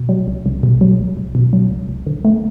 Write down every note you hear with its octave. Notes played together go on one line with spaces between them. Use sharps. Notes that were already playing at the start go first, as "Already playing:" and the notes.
Already playing: B2
F#3
C2
C2
B2
F#3
C2
C2
B2
F#3
C2
C2
D3
A3